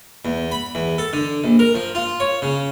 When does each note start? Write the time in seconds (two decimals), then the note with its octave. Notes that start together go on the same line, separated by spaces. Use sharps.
0.25 E2
0.51 B5
0.75 E2
0.98 A4
1.13 D3
1.44 A#1
1.59 A#4
1.75 F3
1.95 F4
2.20 C#5
2.42 C#3